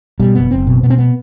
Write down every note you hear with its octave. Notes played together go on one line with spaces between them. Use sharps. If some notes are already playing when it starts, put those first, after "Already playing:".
B2 G3
F#1 B3
F#1 C4
B2
B2 B3
C4
B3